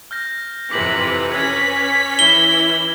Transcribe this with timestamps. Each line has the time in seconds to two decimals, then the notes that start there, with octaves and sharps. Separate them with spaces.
0.11 F6 G6 A#6
0.71 F2 C3 E3 B4 D6 B6 F#7
1.32 C#4 G#6 B6
2.19 E3 E4 G7